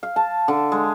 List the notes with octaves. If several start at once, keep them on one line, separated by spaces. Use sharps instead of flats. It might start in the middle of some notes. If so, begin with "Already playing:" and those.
F5
A5
D3
G#3